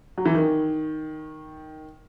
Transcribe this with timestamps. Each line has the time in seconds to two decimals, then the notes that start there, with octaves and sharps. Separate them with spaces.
0.18 F#3
0.26 E3
0.34 D#3